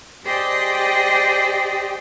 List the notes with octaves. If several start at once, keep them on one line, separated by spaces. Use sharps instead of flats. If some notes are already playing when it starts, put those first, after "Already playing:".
G4 G#4 C5 D5 D#5 G5